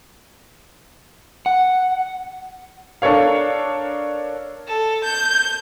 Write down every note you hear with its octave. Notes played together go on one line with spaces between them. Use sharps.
F#5
D4 A4 A#4 C#5 F5
A4
G6